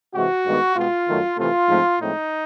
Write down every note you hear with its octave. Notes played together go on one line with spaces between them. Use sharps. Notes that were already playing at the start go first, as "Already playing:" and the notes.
C3 E3 G#3 F#4
G2 D#3 G#3 B3
B2 G#3 B3 F4
F#2 D#3 F#3 A3
C3 E3 A3 F4
G#2 F3 A3 C4
A2 F3 G#3 C4 D#4